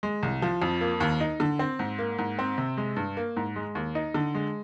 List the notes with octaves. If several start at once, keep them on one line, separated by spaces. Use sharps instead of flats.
G#3
C2
F3
F2
A#3
D#2
D#4
D3
C4
G#2
A#3
G#2
C4
C3
G#3
G2
A#3
G#2
G#3
D#2
D#4
D3
G#3